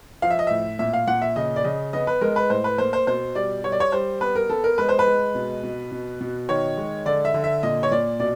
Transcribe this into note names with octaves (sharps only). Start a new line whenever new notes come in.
F3 F5
E5
D#5
A2 E5
A#2 E5
F5
A#2 F#5
E5
C#3 D#5
D5
C#3 D#5
B3 D#5
B4
G#3 A#4
B4
A2 C5
B4
A#3 C5
C5
B2 C5
G3 D5
G3 C#5
D5
C#5
G3 C5
B3 B4
A#4
B3 A4
A#4
G#3 B4
C5
B4
G#3
B2
B2
B2
B2
D#3 C#5
G#3
D3 D5
E5
D3
E5
A#2 D#5
C#5
A#2 D5
B2 D5